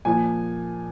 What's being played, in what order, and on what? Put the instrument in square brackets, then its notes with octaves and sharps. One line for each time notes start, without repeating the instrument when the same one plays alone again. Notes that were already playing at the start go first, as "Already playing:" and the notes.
[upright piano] A#2 F3 G#5